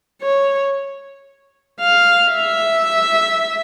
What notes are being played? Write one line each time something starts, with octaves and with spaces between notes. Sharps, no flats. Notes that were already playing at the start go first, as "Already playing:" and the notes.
C#5
F5
E5